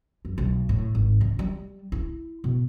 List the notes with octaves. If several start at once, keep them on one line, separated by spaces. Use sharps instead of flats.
F#2
B1
A2
G#1
D3
G3
E4
B2